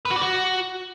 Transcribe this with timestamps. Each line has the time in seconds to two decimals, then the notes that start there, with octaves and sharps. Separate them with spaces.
0.05 B4
0.11 F#4
0.16 D5
0.21 F#4